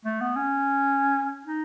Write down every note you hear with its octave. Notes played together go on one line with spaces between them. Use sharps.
A3
B3
C#4
D#4